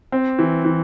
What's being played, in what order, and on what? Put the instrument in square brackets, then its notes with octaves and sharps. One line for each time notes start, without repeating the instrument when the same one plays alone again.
[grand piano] C4
E3
E3